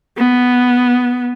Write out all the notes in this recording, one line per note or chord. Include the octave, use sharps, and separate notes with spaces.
B3